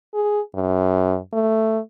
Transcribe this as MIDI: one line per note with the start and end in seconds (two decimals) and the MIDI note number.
0.14 0.40 68
0.55 1.18 42
1.33 1.79 57